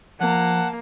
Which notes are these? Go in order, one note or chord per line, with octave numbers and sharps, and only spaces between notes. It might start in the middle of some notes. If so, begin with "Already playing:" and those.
F3 A#3 F#5 A5